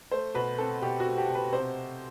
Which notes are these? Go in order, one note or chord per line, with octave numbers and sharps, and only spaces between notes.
A3 C5
B2 B4
C4 A4
B2 G4
F#4
A3
G4
B2
B4
C3 C5